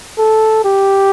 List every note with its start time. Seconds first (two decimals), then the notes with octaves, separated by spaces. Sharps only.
0.18 A4
0.64 G4